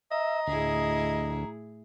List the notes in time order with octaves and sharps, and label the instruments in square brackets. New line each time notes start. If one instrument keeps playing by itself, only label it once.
[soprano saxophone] D#5 [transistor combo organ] E5 [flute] A#5
[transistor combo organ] D2 [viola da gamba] A2 E4 G#4